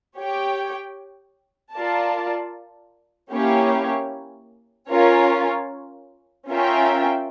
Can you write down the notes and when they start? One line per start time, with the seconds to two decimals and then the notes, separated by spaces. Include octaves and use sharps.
0.17 G4 C#5 G5
1.74 F4 A#4 D5 A5
3.32 A#3 C#4 E4 G4 C#5
4.90 C#4 F4 A#4 C#5
6.49 C#4 F4 A#4 E5 G5